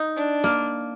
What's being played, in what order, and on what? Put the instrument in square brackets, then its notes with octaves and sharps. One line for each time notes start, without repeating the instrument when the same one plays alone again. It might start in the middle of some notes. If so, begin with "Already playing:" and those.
Already playing: [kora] D#4
[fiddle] D4
[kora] A#3